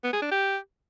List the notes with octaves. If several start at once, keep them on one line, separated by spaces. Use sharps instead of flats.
B3
G#4
D4
G4